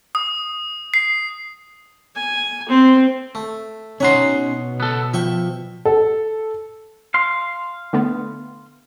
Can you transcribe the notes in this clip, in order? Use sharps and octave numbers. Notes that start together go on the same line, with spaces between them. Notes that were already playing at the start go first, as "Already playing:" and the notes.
D#6
C7
G#5
C4
A3
B2 C#4 D#4 C#5 F#5 A#5 C6
B3 A4
F3 E5 G5 C#6
A4
F5 C6
D3 A3 B3